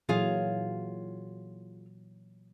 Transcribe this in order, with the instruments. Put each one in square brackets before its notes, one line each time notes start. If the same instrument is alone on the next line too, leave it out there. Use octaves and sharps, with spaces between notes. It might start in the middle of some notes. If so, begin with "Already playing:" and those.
[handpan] A#2 E3 F#3 [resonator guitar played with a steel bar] F4 G#4 F5